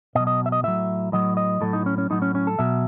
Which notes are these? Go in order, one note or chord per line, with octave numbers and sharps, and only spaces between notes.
B2 F#3 D#5
D#5
E5
D#5
A2 F#3 E5
A2 F#3 D#5
D#5
A2 F#3 A4
D#4
C#4
C#4
A2 F#3 D#4
C#4
C#4
A4
B2 F#3 E5